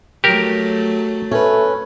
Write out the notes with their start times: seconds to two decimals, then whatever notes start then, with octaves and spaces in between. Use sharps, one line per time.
0.24 F#3 A3 G4 A#4
1.31 A3 C#4 B4